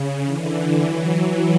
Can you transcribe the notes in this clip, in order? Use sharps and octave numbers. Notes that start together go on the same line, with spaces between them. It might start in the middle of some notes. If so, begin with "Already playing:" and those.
Already playing: C#3
D3 E3
E3 F#3